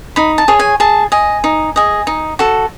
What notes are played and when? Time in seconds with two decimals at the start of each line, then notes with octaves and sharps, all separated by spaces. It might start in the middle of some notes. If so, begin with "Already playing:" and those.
0.16 D#4 B5
0.38 A5
0.48 G#4 C#5
0.59 G#5
0.80 G#4 A5
1.12 D#5 G#5
1.44 D#4
1.76 G#4 D#5
2.07 D#4
2.39 F#4 A4